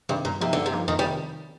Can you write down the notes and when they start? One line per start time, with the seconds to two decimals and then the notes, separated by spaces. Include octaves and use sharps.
0.09 G2 C3 D#3
0.25 G2 A#2
0.41 C3 F3 A#3 D#4
0.53 G2 D3
0.66 C3
0.72 F3 A#3 D#4
0.88 F2 D#3
0.99 G3
1.04 C3 D#3